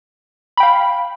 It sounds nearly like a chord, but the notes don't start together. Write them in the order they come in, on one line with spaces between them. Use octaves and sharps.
B5 G5 F5